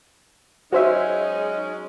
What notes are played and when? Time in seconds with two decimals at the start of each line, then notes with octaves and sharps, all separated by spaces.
0.73 F#3 G#3 C#4 D#4 F#4 C5 E5